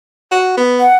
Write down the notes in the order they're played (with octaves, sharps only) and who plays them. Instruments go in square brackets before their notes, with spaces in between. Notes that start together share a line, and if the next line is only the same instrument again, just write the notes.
[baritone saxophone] F#4
B3
[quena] F#5